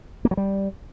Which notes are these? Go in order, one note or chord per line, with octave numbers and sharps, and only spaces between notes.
A#3
F#3
G3